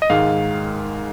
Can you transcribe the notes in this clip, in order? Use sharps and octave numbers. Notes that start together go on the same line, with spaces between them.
D#5
G#2 D#3 G#3 F5